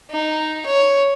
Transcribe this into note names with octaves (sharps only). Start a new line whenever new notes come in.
D#4
C#5